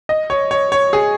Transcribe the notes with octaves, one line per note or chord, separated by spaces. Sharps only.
D#5
C#5
C#5
C#5
G#4